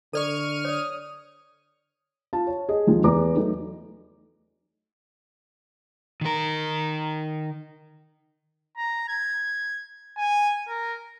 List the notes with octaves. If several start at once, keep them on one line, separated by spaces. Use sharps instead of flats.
D3 A4 D5 D#5 C#6 F6 D#7
C#5 D5 D#6
F4 A5
C#5
G#4 D#5
D#2 D#3 F3 G#3
E2 B4 A#5 D6
F#3 A3 D#4
D#3 A#4
A#5
G#6
G#5
A#4